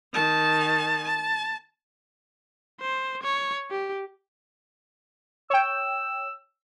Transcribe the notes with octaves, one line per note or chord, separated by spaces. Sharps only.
D#3 A5
A5
C5
C#5
G4
C#5 G5 E6